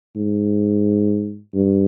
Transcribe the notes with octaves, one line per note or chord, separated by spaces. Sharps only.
G#2
G2